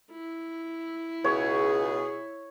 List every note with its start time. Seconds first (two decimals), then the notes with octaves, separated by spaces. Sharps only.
0.12 E4
1.24 C#2 B2 F#4 G#4 C#5